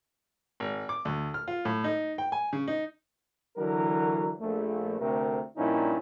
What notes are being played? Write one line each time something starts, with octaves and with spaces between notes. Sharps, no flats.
G#1
D6
D2
F6
F4
A2
D#4
G5
G#5
C#3
D#4
D3 E3 F#3 F#4 A#4
A#1 A3
D2 C3 A3 C4 A#4
G2 A#2 F3 C#4 D#4 E4